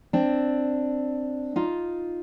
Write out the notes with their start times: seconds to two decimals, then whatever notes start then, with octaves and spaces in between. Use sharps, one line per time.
0.13 C4 D4
1.56 D#4 F4